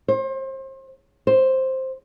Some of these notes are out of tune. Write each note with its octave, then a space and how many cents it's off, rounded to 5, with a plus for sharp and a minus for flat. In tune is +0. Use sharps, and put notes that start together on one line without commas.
C5 +35
C5 +5